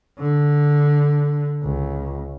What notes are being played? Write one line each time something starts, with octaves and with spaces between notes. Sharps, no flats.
D3
C#2